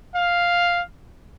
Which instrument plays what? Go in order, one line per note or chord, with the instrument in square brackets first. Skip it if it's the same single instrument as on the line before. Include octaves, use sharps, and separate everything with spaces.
[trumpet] F5